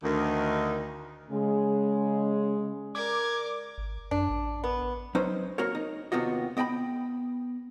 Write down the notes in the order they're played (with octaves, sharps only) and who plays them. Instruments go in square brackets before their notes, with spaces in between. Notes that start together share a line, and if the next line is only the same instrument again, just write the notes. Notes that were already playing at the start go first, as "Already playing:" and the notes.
[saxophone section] D2 D#3
[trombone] C#3 [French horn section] G#3
[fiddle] A#4 [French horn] D5 [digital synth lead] D6 [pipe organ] G#6
[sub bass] G#1
[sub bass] F#2 [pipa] D4
[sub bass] A1
[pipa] B3
[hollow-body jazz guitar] F#3 C#4 D#4 B4 C5
A#3 F#4 A#4 C#5
D#4
D#2 C3 B3 F4 F#4 D#5
B3 D#5 G5 A5 B5